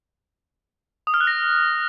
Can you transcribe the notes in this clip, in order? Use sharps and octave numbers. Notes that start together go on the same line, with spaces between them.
D#6
F6
F#6
A#6